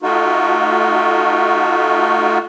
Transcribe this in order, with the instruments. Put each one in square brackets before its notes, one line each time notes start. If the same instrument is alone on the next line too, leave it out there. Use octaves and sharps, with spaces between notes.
[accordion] A3 D#4 F4 F#4